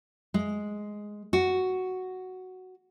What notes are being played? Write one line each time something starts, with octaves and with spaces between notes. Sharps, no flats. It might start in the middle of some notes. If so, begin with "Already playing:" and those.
G#3
F#4